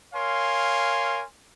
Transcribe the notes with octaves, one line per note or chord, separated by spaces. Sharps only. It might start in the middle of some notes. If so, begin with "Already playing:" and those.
A#4 C#5 F5 G#5 C6